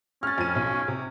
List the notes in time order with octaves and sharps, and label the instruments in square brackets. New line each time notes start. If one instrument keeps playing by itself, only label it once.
[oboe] C#4 [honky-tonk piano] F6 A6
[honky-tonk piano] F2 D#7
B1
C3